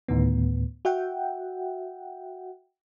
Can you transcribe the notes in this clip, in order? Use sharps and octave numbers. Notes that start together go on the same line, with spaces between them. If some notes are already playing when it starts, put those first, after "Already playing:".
D2 A2 D#3 B3
F#4 E5 F#5 G5